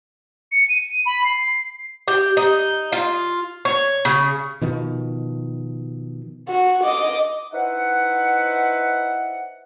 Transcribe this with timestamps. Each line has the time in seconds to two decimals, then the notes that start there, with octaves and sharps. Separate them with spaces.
0.52 C#7
0.69 D#7
1.06 B5
1.24 C7
2.08 G4
2.37 D#4
2.93 F4
3.65 C#5
4.05 C#3
4.62 B2 D#3 F3
6.48 F#4
6.84 D#5 D6
7.54 D#4 E4 B4 C5 F#5